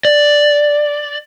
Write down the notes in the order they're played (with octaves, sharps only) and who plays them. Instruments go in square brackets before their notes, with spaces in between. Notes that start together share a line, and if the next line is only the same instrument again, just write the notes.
[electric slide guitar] D5